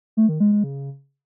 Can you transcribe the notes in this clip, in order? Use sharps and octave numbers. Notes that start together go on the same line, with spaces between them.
A3
D#3
G#3
G#3
C#3